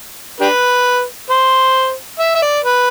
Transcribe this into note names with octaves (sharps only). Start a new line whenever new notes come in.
D4 G4 B4
C5
E5
E5
D5
B4